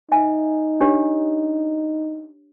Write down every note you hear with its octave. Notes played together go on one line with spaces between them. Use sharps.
D#4 E5 G#5
D4 G4 C#5